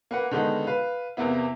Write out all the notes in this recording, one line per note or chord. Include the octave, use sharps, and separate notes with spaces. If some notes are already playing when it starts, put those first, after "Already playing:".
A#3 B4 F#5
D3 D#3 G#3 B3 D#4
B4 F5
E2 C3 A#3 B3 E4